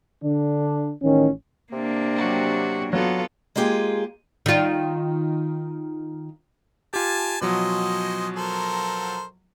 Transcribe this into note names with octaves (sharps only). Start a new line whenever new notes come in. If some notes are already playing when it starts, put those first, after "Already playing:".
D3 D4
A1 D#3 C#4
C3 A#3 D4
F#3 F#4 G4
F#3 B3 F4 A4
G#3 A#3 F4 G4 G#4
D#3 F4
F4 G4 G#5 A5
B2 F3 F#3 C#4 C5 D#5
A4 A#4 C5